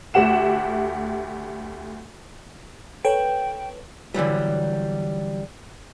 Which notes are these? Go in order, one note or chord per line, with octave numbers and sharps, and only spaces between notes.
D2 A3 G4 F#5 E7
A4 B4 C#5 G5
D3 E3 F#3 G3